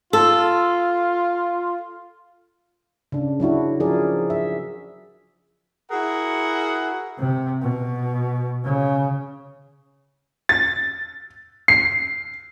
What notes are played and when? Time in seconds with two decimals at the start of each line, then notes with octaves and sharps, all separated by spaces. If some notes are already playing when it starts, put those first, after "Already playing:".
0.13 F4 A4
3.12 C#3 D4
3.40 F#3 D4 E4 F#4
3.80 F3 G#4 A#4 D5
4.30 E5
5.91 E4 F#4 G#4 A#4 F#5
7.19 C3
7.62 B2
8.64 C#3
10.49 A6
11.68 C7